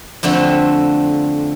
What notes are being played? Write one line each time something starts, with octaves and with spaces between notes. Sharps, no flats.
F2 D3 A3 C4